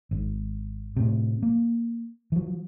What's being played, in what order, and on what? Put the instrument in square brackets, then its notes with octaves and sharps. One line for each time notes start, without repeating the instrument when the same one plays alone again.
[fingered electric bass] G#1
A2 C3
A#3
E3 F#3